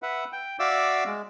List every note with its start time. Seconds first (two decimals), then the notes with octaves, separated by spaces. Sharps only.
0.02 B4 E5 F#5
0.33 G5
0.59 F#4 D5 E5 F5 D6 E6
1.06 G#3